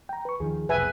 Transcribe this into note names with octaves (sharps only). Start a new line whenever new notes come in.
G5 A#5
B4 C#6
D#2 D#3 F3 G#4
F1 B1 B4 E5 G#5